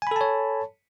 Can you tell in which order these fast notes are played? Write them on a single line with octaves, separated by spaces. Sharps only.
G#5 B5 A4 A5 C#5